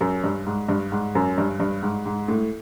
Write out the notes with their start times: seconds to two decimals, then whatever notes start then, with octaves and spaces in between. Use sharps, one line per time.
0.01 F#2
0.24 G2
0.46 G#2
0.68 G2
0.92 G#2
1.15 F#2
1.38 G2
1.60 G2
1.83 G#2
2.06 G#2
2.28 A2